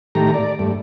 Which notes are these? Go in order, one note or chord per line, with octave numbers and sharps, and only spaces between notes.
A2 D#3 A3 G4 A#5
D5
G2 A3